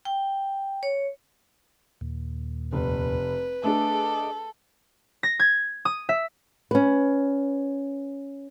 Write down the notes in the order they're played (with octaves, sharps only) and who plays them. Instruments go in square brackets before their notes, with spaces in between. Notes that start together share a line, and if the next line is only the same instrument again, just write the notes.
[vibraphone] G5
C#5
[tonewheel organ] D#2 A#2
[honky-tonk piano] F1 [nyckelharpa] B4
[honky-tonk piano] A3 D4 G#4 [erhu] A4 [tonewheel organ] D#5 D6
[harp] A#6
G#6
D#6
E5
[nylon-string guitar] C#4 B4